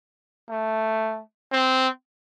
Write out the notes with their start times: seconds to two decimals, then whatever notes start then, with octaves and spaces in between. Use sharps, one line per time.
0.49 A3
1.52 C4